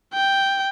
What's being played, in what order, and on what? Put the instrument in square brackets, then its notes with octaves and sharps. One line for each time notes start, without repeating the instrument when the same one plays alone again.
[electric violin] G5